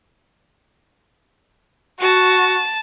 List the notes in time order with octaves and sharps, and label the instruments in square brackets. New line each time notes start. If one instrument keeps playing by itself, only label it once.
[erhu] F#4 [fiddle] A5